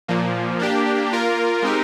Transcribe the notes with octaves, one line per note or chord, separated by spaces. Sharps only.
A#2 F3 A#3
A#3 D4 G4
A#3 F4 A#4
G#3 C4 D#4 G4 A#4